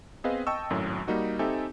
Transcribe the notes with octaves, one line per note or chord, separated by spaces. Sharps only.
B3 C4 G#4 B4 D#5 F5
D#5 G5 A5 C#6 E6
G#1 F#2 A2 F#3
G3 A#3 D#4 F#4
C4 D#4 G4 A4 E5 G#5